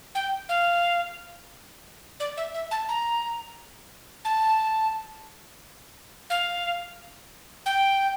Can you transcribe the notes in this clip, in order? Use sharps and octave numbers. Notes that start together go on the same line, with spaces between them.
G5
F5
D5
E5
E5
A5
A#5
A5
F5
G5